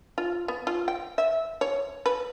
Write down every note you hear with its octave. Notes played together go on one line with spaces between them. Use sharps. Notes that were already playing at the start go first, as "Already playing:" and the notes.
F4
B3
F4
G5
E5
C#5
B4